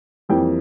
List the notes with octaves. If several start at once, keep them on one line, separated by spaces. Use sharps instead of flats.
F2 E3 G3 A#3 G5